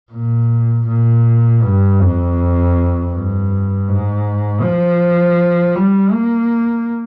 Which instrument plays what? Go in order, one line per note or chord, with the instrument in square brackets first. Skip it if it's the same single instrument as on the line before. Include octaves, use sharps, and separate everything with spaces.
[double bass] A#2
A#2
G2
F2
G2
G#2
F3
G3
A#3